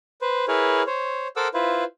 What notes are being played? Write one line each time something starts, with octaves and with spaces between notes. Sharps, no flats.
B4 C5
E4 G#4 A#4 B4 C#5
C5 C#5
A4 A#4 C5 F#5 D6 E6
E4 F4 B4 C5